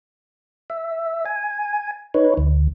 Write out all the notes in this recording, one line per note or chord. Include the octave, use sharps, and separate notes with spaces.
E5
G#5
D#4 B4 C#5
D2